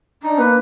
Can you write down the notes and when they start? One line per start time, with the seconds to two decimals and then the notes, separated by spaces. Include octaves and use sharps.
0.23 D4 D#4
0.38 A#3 B4